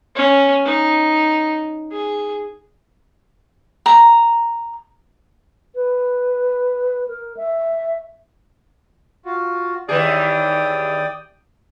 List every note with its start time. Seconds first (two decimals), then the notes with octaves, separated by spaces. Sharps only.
0.15 C#4
0.65 D#4
1.92 G#4
3.86 A#5
5.75 B4
7.08 A#4
7.37 E5
9.25 F4 F#4
9.89 D#2 E3 G#4 D5 G5 D#6